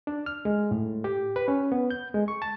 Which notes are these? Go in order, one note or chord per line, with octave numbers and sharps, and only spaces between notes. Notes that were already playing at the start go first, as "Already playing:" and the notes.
D4
F6
G#3
A2
G4
B4
C#4
B3
G6
G#3
C#6
A5